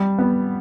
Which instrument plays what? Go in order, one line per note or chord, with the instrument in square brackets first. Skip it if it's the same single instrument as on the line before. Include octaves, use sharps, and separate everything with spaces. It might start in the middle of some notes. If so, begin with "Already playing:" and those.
Already playing: [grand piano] G3
B3